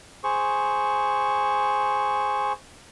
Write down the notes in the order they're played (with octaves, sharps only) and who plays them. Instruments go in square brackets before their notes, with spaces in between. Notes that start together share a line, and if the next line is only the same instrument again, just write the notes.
[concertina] G#4 C5 C#6